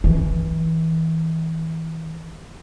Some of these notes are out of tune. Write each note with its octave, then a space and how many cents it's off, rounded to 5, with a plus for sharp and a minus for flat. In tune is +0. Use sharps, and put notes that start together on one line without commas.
E3 -30